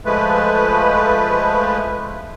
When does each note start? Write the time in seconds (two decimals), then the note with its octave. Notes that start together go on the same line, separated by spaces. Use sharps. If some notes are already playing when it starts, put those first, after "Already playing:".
0.05 F3 G#3 A3 B4